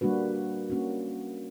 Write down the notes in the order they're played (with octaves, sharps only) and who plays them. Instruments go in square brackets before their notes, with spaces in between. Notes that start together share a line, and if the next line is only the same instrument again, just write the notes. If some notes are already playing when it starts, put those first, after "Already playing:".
[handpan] G3 A#3 D4 F#4 B4
A#3 C#4 F#4